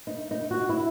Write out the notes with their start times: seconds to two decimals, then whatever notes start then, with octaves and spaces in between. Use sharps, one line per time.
0.07 D#4
0.31 D#4
0.51 F#4
0.69 E4